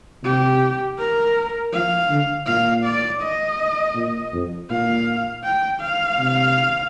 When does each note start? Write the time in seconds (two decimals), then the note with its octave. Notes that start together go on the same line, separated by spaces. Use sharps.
0.24 C3 G4
0.99 A#4
1.73 F3 F5
2.10 D3
2.47 A#2 F5
2.85 D5
3.22 D#5
3.95 A#2
4.33 F2
4.70 A#2 F5
5.44 G5
5.81 F5
6.19 C3